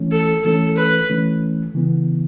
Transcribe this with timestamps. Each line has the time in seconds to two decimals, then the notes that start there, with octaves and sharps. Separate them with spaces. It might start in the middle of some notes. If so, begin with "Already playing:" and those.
Already playing: E3 A3 C#4
0.12 A4
0.45 E3 A3 C#4 A4
0.77 B4
1.10 E3 A3 C#4
1.74 C#3 E3 B3